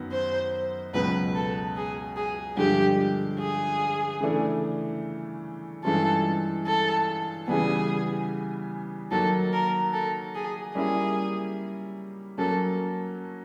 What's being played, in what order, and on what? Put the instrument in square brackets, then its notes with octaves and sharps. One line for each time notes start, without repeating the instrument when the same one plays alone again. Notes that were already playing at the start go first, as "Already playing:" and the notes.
Already playing: [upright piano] F#2 D#3 F#3 B3
[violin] C5
[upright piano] C#2 B2 F#3 [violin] B4
[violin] A4
G#4
G#4
[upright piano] G2 D3 F3 G#3 [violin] G4
[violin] G#4
[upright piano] C#3 E3 A3 D4
[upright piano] G2 E3 G#3 C#4 F4 [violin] A4
[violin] A4
[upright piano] C#3 E3 G3 B3 [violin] G#4
[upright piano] D#3 F#3 A#3 [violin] A4
[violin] A#4
A4
G#4
[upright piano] G3 A#3 C#4 E4 [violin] G#4
[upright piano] F#3 A#3 C#4 [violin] A4